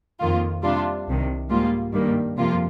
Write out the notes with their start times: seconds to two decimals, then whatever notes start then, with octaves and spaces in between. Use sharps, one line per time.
0.20 F2 D#3 A#3 F4
0.63 C3 G3 D4 F4
1.07 C2 C3 D#3
1.49 G#2 G3 A#3 F4
1.93 G2 D#3 G3 A#3
2.36 F2 C3 F3 A#3 F4